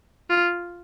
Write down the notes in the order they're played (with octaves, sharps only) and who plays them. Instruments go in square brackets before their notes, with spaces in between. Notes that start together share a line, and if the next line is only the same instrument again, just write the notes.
[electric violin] F4